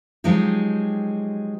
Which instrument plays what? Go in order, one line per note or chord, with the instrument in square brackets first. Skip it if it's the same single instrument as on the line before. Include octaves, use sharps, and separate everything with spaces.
[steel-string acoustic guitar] F3 F#3 G#3 C4 D#4 G4